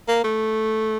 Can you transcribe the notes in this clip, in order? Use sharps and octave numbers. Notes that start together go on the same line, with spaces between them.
A#3
A3